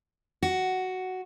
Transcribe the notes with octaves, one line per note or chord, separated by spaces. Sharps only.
F#4